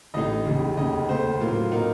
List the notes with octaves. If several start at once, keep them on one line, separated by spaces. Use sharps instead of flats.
A1 A2 A3 D#4 D#5
F1 D#2 C#3
F1 D#2 C#3 D#5
D#2 C#3 A3 C5
A2 F#3 A#3 F4
A2 F#3 A#3 D#4 A#4